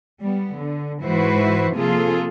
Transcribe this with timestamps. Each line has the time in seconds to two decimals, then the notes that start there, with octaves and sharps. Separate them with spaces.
0.21 G3 B3
0.57 D3
1.02 G#2 E3 E4 F#4 B4 C5
1.74 C3 F3 A#3 F4 G#4 A4